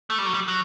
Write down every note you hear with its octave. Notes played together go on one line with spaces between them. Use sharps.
A3
G3
F#3
G3
F#3